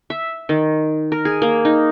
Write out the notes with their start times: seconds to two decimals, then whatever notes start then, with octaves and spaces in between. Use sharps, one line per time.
0.10 E5
0.49 D#3
1.12 A#4
1.25 G#4
1.42 A#3
1.65 D#4